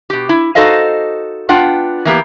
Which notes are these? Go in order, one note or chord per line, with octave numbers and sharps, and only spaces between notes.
B2 G4
E4
D#4 F#4 A4 C5 D#5 F5
B3 D4 F4 F#5 G5
E3 A#3 B3 G4